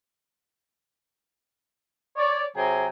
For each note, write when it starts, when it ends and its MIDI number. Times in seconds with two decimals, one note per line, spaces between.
2.17 2.44 73
2.17 2.44 74
2.56 2.87 48
2.56 2.87 54
2.56 2.87 68
2.56 2.87 79
2.56 2.87 80
2.56 2.87 82